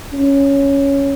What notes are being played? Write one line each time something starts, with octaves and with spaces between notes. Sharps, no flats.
C#4